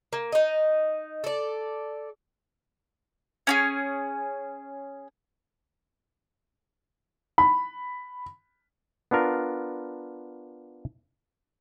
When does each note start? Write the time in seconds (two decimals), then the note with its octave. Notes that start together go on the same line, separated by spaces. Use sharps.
0.13 A#3
0.32 D#4 D#5
1.24 A4 D5
3.47 C#4 F#4 G#4
7.38 B5
9.11 B3 D4 F4 A#4